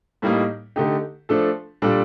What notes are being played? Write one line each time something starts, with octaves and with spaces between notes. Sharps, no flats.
A2 G3 A#3 D#4
D3 A3 D#4 G4
F3 A3 D4 A4
A#2 G3 D4 A4